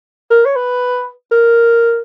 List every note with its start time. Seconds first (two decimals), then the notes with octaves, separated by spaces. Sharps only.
0.31 A#4
0.46 C#5
0.56 B4
1.32 A#4